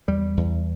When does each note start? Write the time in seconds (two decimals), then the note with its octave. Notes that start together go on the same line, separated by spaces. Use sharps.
0.08 E2 G3
0.37 E2